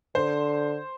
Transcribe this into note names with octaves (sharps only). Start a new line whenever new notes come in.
D3 C5